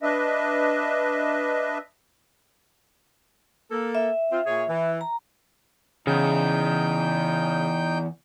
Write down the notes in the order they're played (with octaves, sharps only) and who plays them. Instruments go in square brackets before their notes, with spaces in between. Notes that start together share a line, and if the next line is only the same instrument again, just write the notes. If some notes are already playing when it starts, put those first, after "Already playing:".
[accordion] D4 B4 D#5 E5
[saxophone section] A#3 A4
[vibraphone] E5
[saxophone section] C4 F4
A#2 G#4 C#5
E3
[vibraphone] A#5
[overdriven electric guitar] E2 [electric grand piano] C#3 [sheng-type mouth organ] D#4 G5 G6